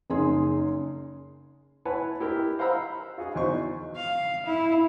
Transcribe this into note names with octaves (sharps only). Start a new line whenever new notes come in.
F#1 D#4 G#4 C6
E4 B4 C#5 F#5 G#5 A5
E4 G4 A#4 E5
C5 F5 F#5 A#5 B5 E6
F4 F#4 G#4
E2 E3 D#4 F#4 C5 C#6
F5
E4